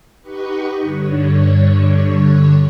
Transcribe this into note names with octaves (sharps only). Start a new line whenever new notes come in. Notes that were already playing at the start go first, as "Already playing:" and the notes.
D#4 G4 B4 D#5 F#5 C#6
G2 D3 C#5